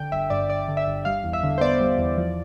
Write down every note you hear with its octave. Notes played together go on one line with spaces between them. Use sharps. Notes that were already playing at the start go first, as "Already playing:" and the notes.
Already playing: D3 G5
G1 E5
G2 D5
G1 D5
D3
E5
G1
G3 F5
E2
E5
D3
C5
B3 D5
G3
E2
F3